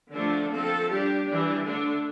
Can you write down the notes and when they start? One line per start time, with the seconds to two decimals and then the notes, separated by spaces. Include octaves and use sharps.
0.13 D3 F3 A3 D4 A4
0.51 F3 A3 C4 A4
0.90 G3 D4 G4
1.27 E3 G3 D4
1.65 D3 A3 D4